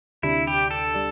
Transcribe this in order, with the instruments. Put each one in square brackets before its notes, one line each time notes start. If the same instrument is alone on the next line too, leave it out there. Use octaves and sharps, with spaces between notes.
[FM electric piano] D2 C3 G3 D4 [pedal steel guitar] E4
[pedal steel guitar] G4
A4
[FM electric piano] G3 D4